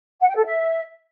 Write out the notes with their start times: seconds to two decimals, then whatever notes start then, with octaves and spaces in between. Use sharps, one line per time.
0.21 F#5
0.29 G5
0.37 A4
0.45 E5